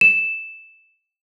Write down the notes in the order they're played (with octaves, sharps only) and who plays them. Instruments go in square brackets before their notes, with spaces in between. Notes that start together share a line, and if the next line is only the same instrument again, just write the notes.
[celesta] E7